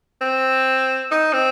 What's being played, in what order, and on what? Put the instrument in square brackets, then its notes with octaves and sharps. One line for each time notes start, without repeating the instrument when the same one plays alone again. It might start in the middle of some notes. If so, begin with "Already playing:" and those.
[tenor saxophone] C4
D#4
C4